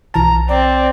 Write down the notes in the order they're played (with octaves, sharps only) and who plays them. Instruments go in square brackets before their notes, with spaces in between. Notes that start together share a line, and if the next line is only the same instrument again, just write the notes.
[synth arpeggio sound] B1 E3 A5 [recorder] A#5
[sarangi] C4 [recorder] D5